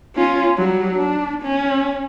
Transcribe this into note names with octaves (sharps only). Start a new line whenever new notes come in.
C#4 F4
F#3 G3
D4
C#4